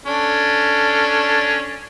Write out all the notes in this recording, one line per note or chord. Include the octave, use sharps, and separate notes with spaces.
C#4 D4 A4